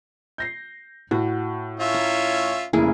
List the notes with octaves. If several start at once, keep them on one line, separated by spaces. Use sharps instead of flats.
G6 A#6 C7
A2 F#4
C#4 F4 E5
A#5
F1 C#3 A#3 E4 G#4